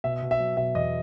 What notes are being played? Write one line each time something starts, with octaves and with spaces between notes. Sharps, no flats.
B2 E5
B2
E5
F#3
B2 E5
E2 D#5